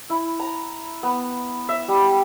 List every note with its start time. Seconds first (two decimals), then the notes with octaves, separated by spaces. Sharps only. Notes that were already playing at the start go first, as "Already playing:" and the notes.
0.10 E4
0.40 A#5
1.03 B3
1.69 E5
1.88 G3